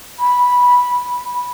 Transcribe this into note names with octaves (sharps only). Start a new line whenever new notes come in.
B5